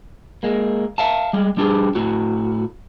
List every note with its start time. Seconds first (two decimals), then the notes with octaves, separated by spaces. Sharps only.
0.43 G#3 A#3
0.98 E5 F5 A5
1.33 G3 G#3
1.57 G3 D4 G4 G#4
1.95 A2 F#4